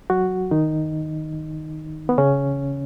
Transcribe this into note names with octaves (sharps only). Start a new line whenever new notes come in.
F#3 F#4
D#3 D#4
B3
C#3 C#4